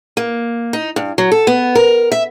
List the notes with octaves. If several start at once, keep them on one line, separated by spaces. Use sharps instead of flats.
A#3
D#4
G2
F#3
A4
B3
A#4
E5